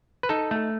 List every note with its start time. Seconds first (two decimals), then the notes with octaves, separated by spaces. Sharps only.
0.23 B4
0.29 D#4 A4
0.51 A3